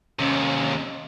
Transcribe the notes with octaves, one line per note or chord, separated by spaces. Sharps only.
D#2 C3 C#4